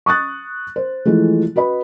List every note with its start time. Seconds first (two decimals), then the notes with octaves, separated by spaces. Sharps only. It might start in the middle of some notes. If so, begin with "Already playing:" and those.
0.06 C#6 D#6 F#6 A6
0.76 C5
1.05 E3 F3 G#3 A3
1.56 F#4 B4 D#5 B5